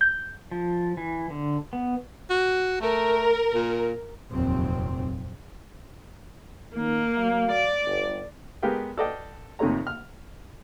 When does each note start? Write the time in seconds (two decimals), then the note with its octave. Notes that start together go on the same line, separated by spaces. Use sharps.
0.01 G6
0.51 F3
0.97 E3
1.30 D3
1.73 B3
2.30 F#4
2.81 A3 A#4
3.54 A#2
4.30 F1 D#2 A#2 F#3 C4
6.75 D#3 A#3 C#4
7.17 F#3 F5
7.51 D5
7.86 G1
8.63 G#3 B3 G4 A#4 F5 G5
8.97 A4 B4 D5 D#5 F5 G5
9.59 F2 C3 D#3 A3 C#5 A#5
9.87 F6